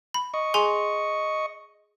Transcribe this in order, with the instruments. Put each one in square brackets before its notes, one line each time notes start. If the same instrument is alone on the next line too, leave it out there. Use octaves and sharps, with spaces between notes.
[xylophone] B5
[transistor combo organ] D#5 C#6
[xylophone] G#4 G#5 C6